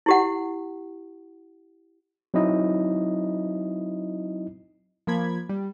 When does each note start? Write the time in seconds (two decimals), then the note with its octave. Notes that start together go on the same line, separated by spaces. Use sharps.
0.06 E4 G4 F#5
2.34 F#3 C4 D#4 E4 D#5
5.07 F3 A#3 B5 G#6
5.49 G3